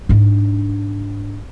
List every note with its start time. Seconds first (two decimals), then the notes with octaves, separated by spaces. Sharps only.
0.09 G#2 D4